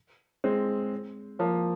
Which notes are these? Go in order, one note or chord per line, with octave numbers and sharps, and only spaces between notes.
G#3 C4
F3 A#3